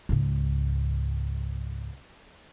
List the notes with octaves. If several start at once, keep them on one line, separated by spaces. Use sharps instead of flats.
C#2 G#2